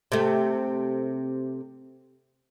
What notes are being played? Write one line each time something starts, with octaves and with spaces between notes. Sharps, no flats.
C3 A3